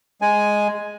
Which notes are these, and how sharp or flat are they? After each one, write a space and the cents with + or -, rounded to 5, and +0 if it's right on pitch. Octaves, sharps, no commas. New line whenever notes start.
G#3 +0 G#5 +5